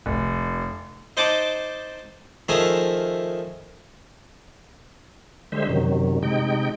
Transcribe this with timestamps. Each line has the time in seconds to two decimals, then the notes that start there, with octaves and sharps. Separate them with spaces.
0.06 F1
1.17 D#4 C5 D#5 F#5 A5 D6
2.49 D#3 F3 A3 G#4 E5 A#5
5.52 D3 G3 G#3 C5 E5
5.69 F#2 C3 D#3 F#3
6.23 C3 G#3 D#4 G5